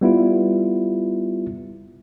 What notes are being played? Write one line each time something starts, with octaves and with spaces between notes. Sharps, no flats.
G3 B3 E4 F4